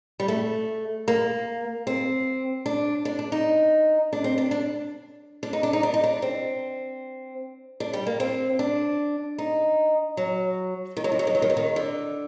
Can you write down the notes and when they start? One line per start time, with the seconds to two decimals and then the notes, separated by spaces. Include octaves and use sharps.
0.20 G3
0.28 A3
1.08 A#3
1.87 C4
2.66 D4
3.05 D4
3.19 D4
3.32 D#4
4.13 D4
4.24 C4
4.38 D4
4.51 D4
5.43 D4
5.53 D#4
5.63 D4
5.73 D#4
5.83 D4
5.94 D#4
6.04 D4
6.22 C4
7.80 D4
7.93 G3
8.07 A#3
8.20 C4
8.59 D4
9.38 D#4
10.17 F#3
10.97 D#3
11.04 F#3
11.12 D#3
11.19 F#3
11.27 D#3
11.35 F#3
11.42 D#3
11.50 F#3
11.57 D#3
11.76 D3